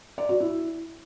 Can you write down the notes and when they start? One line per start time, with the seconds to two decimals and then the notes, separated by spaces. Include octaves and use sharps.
0.18 D5
0.29 F#4
0.40 E4